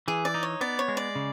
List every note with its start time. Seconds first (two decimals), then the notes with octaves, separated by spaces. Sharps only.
0.08 E3 G#4
0.25 D5
0.34 D#4
0.43 C#5
0.61 B3 D5
0.79 C#5
0.88 G#3
0.97 D5
1.15 C#3